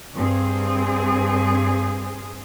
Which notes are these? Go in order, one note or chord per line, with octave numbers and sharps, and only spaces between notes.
G2 C4 G#4